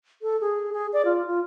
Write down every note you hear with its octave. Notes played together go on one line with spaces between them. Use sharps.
A4
G#4
G#4
D5
F4
F4